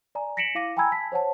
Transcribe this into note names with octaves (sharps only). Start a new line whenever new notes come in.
D5 G#5 A#5
A#6 B6 C#7 D7 E7 F#7
E4 F5 D6 A#6 D#7
G5 G#5 A#5 B5 E6 G#6
A5 B6
C5 C#5 F#5 A5